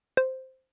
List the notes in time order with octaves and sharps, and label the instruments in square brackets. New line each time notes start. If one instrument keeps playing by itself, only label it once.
[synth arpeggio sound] C5